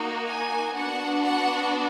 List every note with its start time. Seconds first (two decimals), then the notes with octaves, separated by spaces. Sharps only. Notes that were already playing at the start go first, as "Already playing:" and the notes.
Already playing: A#3 D#4 F#4
0.27 G#5
0.75 B3 D4 F#4 F#5
1.23 F#5